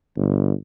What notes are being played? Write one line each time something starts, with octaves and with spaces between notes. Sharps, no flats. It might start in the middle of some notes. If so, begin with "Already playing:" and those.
G1